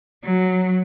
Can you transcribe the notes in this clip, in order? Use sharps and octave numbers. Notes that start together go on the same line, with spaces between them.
F#3